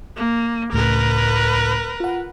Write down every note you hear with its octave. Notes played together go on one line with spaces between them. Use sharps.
A#3
C#2 A2 C#3 A#4 B4
F4 F#5